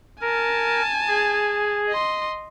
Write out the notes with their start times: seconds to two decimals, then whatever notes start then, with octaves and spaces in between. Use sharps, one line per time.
0.21 A#4 G#5 A5
1.08 G#4
1.89 D#5 C6